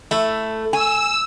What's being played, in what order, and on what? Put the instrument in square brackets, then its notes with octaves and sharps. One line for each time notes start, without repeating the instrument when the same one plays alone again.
[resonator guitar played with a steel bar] A3 [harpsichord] E4
[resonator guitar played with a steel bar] G#5 [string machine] E6